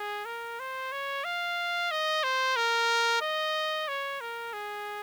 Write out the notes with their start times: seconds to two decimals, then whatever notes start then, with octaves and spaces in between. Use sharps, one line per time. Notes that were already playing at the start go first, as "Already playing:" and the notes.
Already playing: G#4
0.25 A#4
0.60 C5
0.92 C#5
1.24 F5
1.91 D#5
2.23 C5
2.56 A#4
3.22 D#5
3.88 C#5
4.21 A#4
4.53 G#4